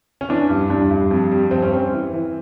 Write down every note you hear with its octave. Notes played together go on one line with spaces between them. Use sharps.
C#4
E3 D4
G2
G2 D4
G2
F2
G3
G2 C4
C#4
G3 C4
E3
E3